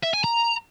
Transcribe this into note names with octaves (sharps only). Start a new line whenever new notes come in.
E5
G#5
A#5